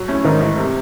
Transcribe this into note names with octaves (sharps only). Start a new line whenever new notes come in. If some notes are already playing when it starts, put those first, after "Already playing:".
Already playing: F#3
A3 C#4 E4
G#2 D#3
E3 A3
C3